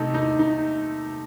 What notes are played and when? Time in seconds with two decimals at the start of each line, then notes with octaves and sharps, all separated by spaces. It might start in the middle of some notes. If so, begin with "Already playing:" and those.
Already playing: C3 A3 D#4
0.14 D#4
0.39 D#4